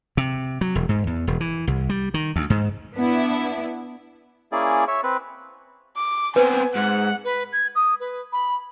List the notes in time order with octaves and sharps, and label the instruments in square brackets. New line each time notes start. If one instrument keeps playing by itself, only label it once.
[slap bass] C3
F#3
E1
G#2
E2
E1
E3
C2
G3
D#3
D2
G#2
[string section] B3 D4 E4
[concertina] A#3 C#4 E4 G#4 D5
C#5 E5 C#6
C4 B4
[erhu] D6
[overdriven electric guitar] B3 C4 [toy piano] B4 [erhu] G#5
[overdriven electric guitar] G#2 [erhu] F#5
[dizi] B4
G#6
D#6
B4
B5